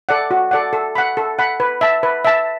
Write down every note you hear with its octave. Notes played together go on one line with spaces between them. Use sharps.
A4 D5 F#5
F#4
A4 D5 F#5
A4
F#5 B5
A4
F#5 B5
B4
E5 A5
B4
E5 A5